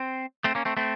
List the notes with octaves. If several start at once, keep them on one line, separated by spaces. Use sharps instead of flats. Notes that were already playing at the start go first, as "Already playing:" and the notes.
Already playing: C4
A3 C4
A#3 C#4
A3 C4
A3 C4